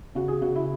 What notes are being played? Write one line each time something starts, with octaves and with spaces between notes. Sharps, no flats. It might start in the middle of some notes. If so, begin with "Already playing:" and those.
C#3 F#4
G#4
C#3 F#4
E4